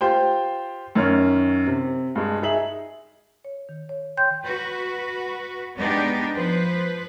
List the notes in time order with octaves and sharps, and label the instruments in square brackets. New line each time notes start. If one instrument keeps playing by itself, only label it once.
[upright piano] F4 G4 C5 G5
F#2 D#3 C#4 C#5 F6
C3
G2 G#3
D#4 G#4 E5 F#7
[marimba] C#5
D#3
C#5
C#5 G5 C6 G6
[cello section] F#4 B4
G#3 B3 D4 D#4 G4
F3 B4 C5